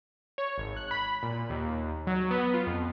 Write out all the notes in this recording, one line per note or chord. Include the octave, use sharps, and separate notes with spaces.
C#5
G#1
F#6
B5
A#2
D#2
F#3
B3
F4
F2